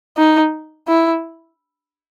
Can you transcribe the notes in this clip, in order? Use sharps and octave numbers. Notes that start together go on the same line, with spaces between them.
D#4
E4